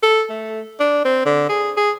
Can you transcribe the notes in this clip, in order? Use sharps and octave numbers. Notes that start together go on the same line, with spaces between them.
A4
A3
D4
C4
D3
G#4
G#4